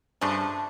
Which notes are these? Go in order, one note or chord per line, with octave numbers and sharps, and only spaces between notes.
G2 C#3 F3 A3 D4